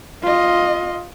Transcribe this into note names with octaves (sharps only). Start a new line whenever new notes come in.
F4 D#5